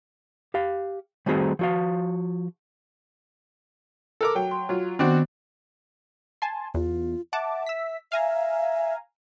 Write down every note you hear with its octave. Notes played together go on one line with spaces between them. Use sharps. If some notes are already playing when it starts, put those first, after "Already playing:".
G4 F5
D#3 G3 A3 C4 F#4 G#4
F3 F#4 F5
A4 A#4 D6
F#3 G5
C6
F#3 F4
D#3 B3 C4 D4 F#4
G#5 A5 C6
E2 F4
E5 F#5 A5 D6
E6 B6
E5 F5 G#5 A#5